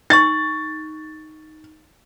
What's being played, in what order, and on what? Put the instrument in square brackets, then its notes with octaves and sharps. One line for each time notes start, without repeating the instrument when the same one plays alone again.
[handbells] D#4 C#6 [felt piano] A6